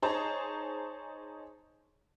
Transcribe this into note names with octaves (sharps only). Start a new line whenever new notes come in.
D#4 G#4 C5 C#5 A5 A#5